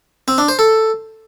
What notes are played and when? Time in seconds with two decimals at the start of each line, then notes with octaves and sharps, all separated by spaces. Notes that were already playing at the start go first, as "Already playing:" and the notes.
0.28 C4
0.38 D4
0.48 C5
0.59 A4